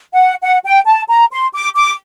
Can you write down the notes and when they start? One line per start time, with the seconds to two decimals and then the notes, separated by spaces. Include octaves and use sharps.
0.13 F#5
0.43 F#5
0.64 G5
0.87 A5
1.09 A#5
1.32 C6
1.53 D6
1.75 D6